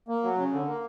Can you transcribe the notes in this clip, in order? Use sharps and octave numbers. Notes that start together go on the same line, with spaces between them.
A#3
F#3
C#3
D3
A#3